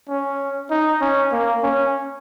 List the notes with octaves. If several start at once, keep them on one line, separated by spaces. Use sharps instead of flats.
C#4
D#4
C#4
A#3
C#4